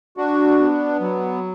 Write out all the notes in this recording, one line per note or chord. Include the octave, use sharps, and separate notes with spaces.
D4 F#4
B3
F#3